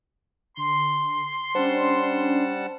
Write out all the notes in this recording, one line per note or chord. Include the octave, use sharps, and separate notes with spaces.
D3 C6
G3 C#4 D4 C5 F#5 A5